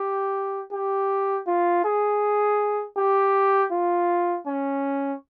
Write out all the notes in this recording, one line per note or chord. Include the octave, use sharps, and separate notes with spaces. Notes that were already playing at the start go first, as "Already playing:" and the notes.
Already playing: G4
G4
F4
G#4
G4
F4
C#4